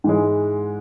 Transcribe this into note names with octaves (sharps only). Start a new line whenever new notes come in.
G#2 E3 G#3